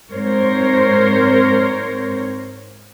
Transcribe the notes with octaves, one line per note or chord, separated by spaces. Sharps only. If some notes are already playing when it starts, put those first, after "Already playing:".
G#2 C4 A#4 C5 C#5